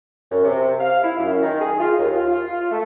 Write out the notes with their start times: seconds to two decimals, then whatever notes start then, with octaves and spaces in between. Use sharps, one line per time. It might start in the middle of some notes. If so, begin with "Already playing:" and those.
0.32 F#2
0.44 C3
0.80 F5
1.03 E4
1.18 F#2
1.42 D#3
1.61 G#4
1.80 F4
1.98 D#2
2.14 F4
2.30 F4
2.71 A3